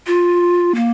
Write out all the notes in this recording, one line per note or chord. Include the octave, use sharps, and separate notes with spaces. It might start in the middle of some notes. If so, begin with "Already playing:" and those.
F4
A#3